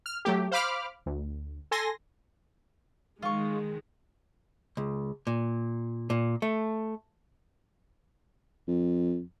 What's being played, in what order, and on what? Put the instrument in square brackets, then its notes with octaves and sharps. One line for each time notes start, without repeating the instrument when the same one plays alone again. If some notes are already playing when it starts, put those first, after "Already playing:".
[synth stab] F6
F#3 A3 G4
C5 F5 B5 D6 F6
D2
A4 G#5 C6 A#6
[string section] D#3 G#3 [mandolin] F4 C#6
[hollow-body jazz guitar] C#2
A#2
A#2
A3
[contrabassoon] F2